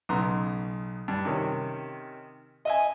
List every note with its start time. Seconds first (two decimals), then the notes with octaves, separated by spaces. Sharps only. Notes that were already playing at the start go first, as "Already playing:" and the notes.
0.09 B1 C#3 B3 A#5 C6
1.08 G2
1.25 C3 D#3 C#4
2.65 D#5 E5 G#5